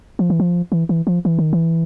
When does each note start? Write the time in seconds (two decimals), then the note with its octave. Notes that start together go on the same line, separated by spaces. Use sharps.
0.19 F3
0.30 E3
0.40 F3
0.72 E3
0.89 E3
1.07 F3
1.25 E3
1.39 D#3
1.53 E3